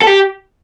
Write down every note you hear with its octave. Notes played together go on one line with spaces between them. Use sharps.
A4
G4